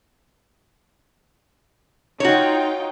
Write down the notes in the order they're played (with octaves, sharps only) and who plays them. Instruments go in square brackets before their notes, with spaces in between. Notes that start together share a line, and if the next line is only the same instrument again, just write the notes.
[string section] D#4 F4 G5 [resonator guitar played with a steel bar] F#4 C#5